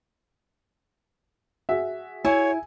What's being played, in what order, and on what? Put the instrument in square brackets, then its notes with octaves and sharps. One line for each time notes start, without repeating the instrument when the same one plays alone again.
[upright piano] F#4 G#4 E5
[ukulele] E4 [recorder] C#5 [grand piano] G#5